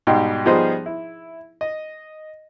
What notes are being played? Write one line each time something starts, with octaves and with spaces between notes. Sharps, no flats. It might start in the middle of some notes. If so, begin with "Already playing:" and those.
G#2 B2 G3 D#4 G4
F3 G3 B3 D#4 G#4 C5
E4
D#5